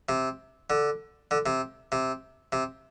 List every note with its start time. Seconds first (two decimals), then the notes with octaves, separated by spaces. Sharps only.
0.09 C3
0.70 D3
1.31 D3
1.46 C3
1.92 C3
2.52 C3